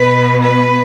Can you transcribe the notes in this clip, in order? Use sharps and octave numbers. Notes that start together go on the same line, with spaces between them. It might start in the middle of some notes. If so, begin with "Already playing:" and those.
Already playing: B2 B3 B4
B4